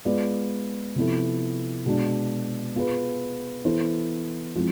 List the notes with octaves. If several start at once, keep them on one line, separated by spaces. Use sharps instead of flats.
G#3 B3 F4 B4 D5
C3 F3 B3 E4 A4
B2 G#3 D4
B3 F4 G#4 B4
E3 B3 E4 A4 C5
F3 G#3 C4 E4